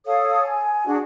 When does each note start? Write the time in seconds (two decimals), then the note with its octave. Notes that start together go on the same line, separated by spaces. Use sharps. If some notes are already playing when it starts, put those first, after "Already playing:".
0.06 A4 C#5 F5 D#6
0.43 G#5
0.86 D4 F#4 G#4